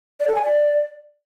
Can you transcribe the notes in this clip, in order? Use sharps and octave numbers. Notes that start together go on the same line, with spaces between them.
D5
A4
G#5
D5